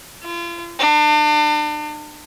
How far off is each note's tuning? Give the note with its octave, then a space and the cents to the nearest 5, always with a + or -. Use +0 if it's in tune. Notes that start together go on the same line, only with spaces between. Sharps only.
F4 -35
D4 +35